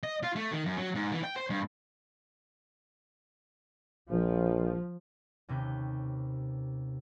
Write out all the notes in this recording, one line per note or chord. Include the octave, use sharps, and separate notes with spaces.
D#5
F4
A3
D#3
F#2
F#3
G#2
E3
G5
C5
G2
A#1 F3
D#2 C3 C#4 B4 G6